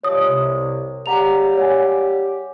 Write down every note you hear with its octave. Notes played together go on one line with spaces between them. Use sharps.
F3 G3 G#3 C#5 D#6
C2 C3
C#3 G3 G4 F#5 A#5 F7
C#5 F#5 G#5